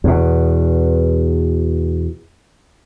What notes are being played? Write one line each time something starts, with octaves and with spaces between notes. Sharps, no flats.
E2 B2